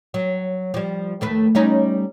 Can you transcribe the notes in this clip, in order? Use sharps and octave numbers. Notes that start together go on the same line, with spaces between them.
F#3
F3 G3
D#2 A3 B4
G3 C#4 D#4